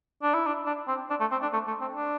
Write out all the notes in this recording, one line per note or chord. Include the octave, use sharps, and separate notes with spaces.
D4
E4
D4
D4
C4
D4
A3
C4
D4
A3
A3
C4
D4